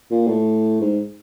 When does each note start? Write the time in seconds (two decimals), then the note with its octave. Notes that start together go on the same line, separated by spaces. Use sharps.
0.11 A#2
0.27 A2
0.81 G#2